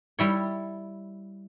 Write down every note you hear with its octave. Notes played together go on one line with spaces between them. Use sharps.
G3 E4 C#5